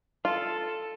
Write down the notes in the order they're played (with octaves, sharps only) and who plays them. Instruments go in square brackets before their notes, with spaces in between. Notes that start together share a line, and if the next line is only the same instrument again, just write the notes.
[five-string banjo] F4 [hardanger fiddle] A4